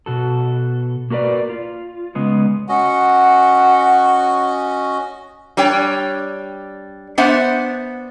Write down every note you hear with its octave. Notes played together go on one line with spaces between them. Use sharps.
B2 F#4 A4
A#3 F#4 A#4 B4 D5
F4
C#3 G#3 B3 C#4
C#4 F#4 D#5 F#5
G3 D4 C#5 G5
B3 D4 C5 E5 F#5